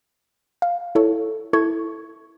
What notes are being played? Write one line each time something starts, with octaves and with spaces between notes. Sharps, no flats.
F5
E4 A4 C#5
E4 A4 C#6 G#6